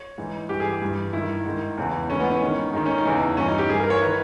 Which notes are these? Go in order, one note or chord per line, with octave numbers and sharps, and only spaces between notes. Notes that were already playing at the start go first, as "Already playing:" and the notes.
Already playing: C#5
G#2 E3
G2 E3 G4
G#4
G4
G2 E3
G2 D#3 E4
G#2 D#3
E2 C#3 E3
G#2 E3 C#4
B3
C#4
G#2 D#3
G#2 D#3 D#4
C#4
D#4
E2 C#3 E3
G2 E3 C#4
D#4
G4
G2 E3 G#4
A#4
C#5
D#3 B4